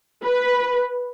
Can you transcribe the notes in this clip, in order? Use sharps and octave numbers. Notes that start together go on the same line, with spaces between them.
B4